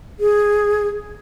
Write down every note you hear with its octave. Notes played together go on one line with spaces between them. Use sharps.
G#4